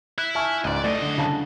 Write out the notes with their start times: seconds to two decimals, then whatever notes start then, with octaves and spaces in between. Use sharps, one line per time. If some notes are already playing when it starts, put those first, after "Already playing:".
0.18 E4 F#6
0.35 E5 G#5 A5 C#6 F6
0.64 C#2 G#2 D5 D#5
0.84 F#2 A3 D5 D#5
1.02 D3
1.18 C#3 A5